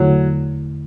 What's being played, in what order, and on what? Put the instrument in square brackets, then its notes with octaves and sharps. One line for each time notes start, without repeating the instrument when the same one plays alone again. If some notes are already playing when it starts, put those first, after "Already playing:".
Already playing: [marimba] E2 D3 A3 E4 A4 [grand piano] F#3